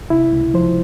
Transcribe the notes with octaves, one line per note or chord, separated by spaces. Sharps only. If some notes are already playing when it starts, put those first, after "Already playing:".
C3 E4
C#2
F3 C5